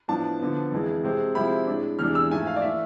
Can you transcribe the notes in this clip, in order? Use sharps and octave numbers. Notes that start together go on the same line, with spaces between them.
A2 F3 B3 D4 A5
D3 F3 B3
F2 E3 G#3
C3 G#3 C4
C3 F3 G#3 C4 E4 B5
A2 G#3 D4
E2 C3 G#3 D4 F6
E6
G#2 F3 A3 G#5
F5
D5
E3 A3 E5